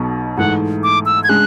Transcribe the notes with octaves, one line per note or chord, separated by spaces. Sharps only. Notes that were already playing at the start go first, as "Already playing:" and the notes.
Already playing: B1 B2 F#3
G#2 E3 A3 F#5
D6
E6
G#6
C#3 G#3 D4 G#4 F#6